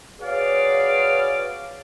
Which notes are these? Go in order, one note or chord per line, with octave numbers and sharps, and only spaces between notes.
F#4 G#4 B4 C#5 D5 F5